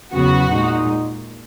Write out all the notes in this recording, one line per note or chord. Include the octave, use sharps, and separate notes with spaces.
E2 C#3 F#3 B3 F#4
A#2 G#3 D#4